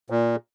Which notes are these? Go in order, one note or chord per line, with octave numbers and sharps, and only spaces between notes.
A#2